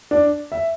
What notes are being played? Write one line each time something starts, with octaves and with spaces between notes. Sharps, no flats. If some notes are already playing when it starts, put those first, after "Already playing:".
D4
E5